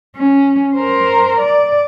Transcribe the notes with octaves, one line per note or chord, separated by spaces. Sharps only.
C#4
A#4 C5
D5